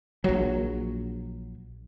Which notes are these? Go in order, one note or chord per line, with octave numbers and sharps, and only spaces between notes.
A#1 F#3